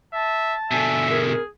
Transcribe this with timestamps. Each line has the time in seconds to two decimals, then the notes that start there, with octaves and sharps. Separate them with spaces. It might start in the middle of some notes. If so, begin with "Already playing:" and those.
0.14 E5 A5
0.71 B2 D3 E5 G#5
1.10 G#4 A#4